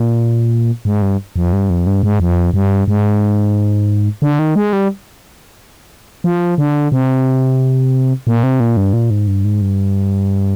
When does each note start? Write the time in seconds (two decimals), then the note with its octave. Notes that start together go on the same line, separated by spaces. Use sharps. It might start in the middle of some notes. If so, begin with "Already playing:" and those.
Already playing: A#2
0.85 G#2
1.02 G2
1.36 F2
1.53 G2
1.70 F2
1.87 G2
2.03 G#2
2.20 F2
2.54 G2
2.88 G#2
4.22 D3
4.39 D#3
4.56 G#3
4.73 G3
6.24 F3
6.58 D3
6.92 C3
8.27 A#2
8.43 C3
8.60 A#2
8.77 G2
8.93 A#2
9.10 G#2
9.28 G2
9.45 G#2
9.61 G2